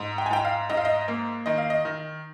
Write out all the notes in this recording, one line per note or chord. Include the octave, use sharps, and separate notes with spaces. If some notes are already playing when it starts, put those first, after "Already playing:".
Already playing: G#2
G5
G#5
G#2 G5
F5
G#2 D#5
F5
D#5
A#3
D#3 D#5
F5
D#5
D#3